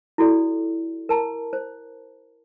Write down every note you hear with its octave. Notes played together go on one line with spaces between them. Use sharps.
E4 F#4 A4 D5
A#4 A5 A#5
C5